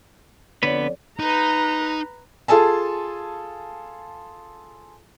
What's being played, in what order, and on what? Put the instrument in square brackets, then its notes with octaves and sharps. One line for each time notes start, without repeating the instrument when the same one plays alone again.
[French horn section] F2 C#5 D5 [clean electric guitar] D3 B3 B4
[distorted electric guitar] D#4 [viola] B4 A#5
[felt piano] F4 G#4 A4 G#5 A5